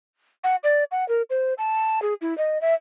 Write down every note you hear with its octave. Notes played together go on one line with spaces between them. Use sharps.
F#5
D5
F#5
A#4
C5
A5
G#4
E4
D#5
E5